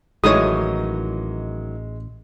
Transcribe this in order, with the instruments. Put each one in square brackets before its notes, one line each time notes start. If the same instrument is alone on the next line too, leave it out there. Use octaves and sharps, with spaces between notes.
[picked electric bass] A1 [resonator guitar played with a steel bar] D#3 E3 F#3 [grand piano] G#3 [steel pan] C#5 D#6